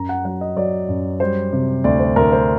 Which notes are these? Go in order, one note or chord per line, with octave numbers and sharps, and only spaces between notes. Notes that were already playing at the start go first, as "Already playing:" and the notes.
Already playing: F#2 A#5
F#5
F#3 F#5
D#5
F#3 D5
F#2
G3 C5
C3
D2 D5
C5
D2 A#4
C5